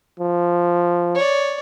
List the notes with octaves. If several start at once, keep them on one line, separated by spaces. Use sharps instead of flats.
F3
C#5 D5